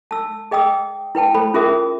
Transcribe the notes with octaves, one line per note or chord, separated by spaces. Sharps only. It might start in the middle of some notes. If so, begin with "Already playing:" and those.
A5 E6
G#4 D#5 G5 D#6 E6
E4 B4 G5 A5
A4 C5 B5
C#4 F4 G#4 A#4 E5 D#6